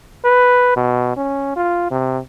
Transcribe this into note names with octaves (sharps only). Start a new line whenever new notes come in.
B4
B2
C#4
F4
C3